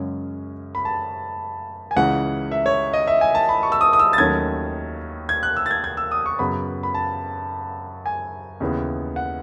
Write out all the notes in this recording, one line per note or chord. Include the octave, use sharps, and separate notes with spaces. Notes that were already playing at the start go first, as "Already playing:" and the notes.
Already playing: F#2 C#3 G#3 C#4
B5
A5
G#5
C#2 C#3 E3 F#5
E5
C#5
D#5
E5
G#5
A5
B5
C#6
E6
D#6
D#6
E6
A6
D#2 D#3 F#3 A3 C#4 G#6
G#6
F#6
E6
A6
G#6
G#6
E6
D#6
C#6
F#2 C#3 F#3 B3 B5
B5
A5
G#5
D#2 C#3 E3 B3
F#5